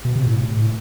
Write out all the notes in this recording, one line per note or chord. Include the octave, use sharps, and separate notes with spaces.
B2
C3
A2